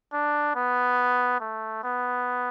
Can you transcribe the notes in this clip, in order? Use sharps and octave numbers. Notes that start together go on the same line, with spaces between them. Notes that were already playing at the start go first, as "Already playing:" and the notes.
D4
B3
A3
B3